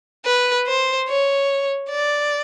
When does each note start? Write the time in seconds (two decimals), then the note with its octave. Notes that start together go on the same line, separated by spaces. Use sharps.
0.26 B4
0.67 C5
1.09 C#5
1.90 D5